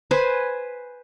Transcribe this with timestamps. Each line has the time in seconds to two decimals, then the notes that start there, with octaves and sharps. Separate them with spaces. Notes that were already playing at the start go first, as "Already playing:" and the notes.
0.11 B4 C5 G#5